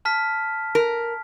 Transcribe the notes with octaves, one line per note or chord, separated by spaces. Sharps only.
A5 F6 B6
A#4